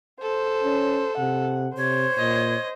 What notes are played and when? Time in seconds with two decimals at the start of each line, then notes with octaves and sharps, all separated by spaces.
0.22 A4 C5
0.64 C#4
1.18 C3 F#5
1.75 C3 C5 C#5
2.18 A#2 D#5